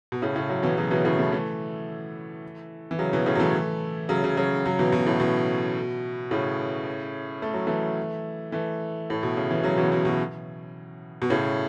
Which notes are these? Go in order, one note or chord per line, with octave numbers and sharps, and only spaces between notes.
B2
A2 C#3
A2 C#3
C#3 F#3
B2 E3
C#3 F#3
B2 E3
A2 C#3
E3 A3
E3 A3
E3
C#3 F#3
B2 E3
A2 C#3
F#3
E3 A3
C#3 F#3
C#3 F#3
C#3 F#3
C#3 F#3
B2 E3
B2
A2
B2
A2 C#3
A3
F#3
E3 A3
E3 A3
A2
B2
C#3
E3
C#3 F#3
B2 E3
B2
B2
B2
A2 C#3